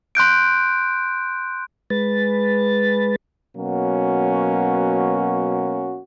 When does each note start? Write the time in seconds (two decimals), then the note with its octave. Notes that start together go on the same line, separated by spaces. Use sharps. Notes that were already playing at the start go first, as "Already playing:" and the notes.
0.15 C6 F#6 G6 D7
1.90 G#3 B4 A6
3.56 B2 F#3 A#3 C#4 F#4